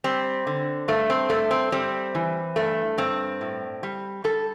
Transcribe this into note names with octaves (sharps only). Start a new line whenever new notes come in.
G3 C4
D3
G2 A3
C4
G2 A3
C4
G3 C4
E3
G2 A3
G2 C4
A2
G3
G3 A4